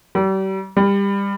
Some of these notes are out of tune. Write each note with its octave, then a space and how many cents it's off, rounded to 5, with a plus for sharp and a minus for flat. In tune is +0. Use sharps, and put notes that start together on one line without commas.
G3 -35
G3 +25